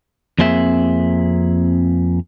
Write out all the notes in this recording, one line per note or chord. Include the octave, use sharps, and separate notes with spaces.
F2 A#3 C4 G#4 E5